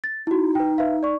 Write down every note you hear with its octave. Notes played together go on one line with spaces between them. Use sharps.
A6
D#4 E4 F#4
B4 G5
B4 E5 F5
D5 C#6